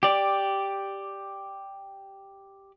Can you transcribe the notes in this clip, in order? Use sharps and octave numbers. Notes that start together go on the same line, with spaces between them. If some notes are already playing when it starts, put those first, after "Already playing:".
G4 D5